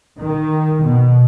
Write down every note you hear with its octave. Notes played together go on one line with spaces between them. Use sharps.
D#3
B2